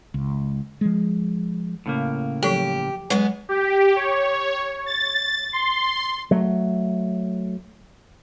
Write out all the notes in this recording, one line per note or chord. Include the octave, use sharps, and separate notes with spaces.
C#2
F3 G#3
A2 C#3 A#3
F3 F#3 G4 A4
F#3 G#3 B3 B4 F#5
G4
C#5
A6
C6
F#3 A3